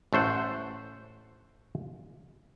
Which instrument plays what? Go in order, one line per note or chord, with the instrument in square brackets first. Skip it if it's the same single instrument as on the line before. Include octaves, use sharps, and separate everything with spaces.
[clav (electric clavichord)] A1 A3 C5 F#5